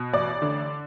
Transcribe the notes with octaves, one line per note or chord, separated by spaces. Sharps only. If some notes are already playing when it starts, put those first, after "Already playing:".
Already playing: B2
A1 D5
D3